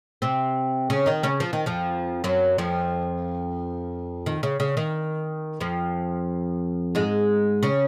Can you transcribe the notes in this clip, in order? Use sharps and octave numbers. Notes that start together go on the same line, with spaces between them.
C3 C4
C#3 C#4
D#3 D#4
C#3 C#4
F3
D#3
F2 F3
F#2 F#3
F2 F3
D#3
C#3
C#3
D#3
F2 F3
G#2 G#3
C#3 C#4